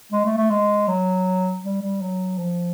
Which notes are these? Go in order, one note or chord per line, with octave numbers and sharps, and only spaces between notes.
G#3
A3
A3
G#3
F#3
G3
G3
F#3
F3